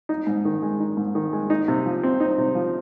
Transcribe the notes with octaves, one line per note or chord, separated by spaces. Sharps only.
D#4
G#2
D#3
G#3
D#4
G#2
D#3
G#3
D#4
C3
F3
C4
D#4
C3
F3